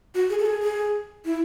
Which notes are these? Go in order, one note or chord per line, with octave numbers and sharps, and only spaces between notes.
F#4
G#4
A4
G#4
G#4
E4